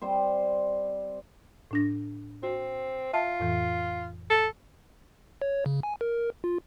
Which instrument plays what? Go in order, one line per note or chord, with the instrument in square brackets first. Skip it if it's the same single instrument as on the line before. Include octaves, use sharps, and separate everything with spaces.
[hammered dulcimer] G3 C4 C5
[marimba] A2 D4 A#6
[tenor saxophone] C4 [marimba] F#4
[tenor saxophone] F4 [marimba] E5 A5
[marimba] F2 A2 E3
[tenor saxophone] A4
[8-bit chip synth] C#5
C#3
G#5
A#4
F4